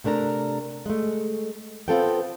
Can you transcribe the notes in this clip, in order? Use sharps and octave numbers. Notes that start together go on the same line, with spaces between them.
C3 A3 D4 A#4 A#5
G#3 A3
B3 C4 F4 A4 C5 G5